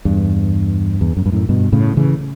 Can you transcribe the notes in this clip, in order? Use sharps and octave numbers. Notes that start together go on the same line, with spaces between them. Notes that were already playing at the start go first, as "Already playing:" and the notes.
E2 G2
E2
F#2
G2
F#2 A2
G2 B2
A2 C#3
C#3 E3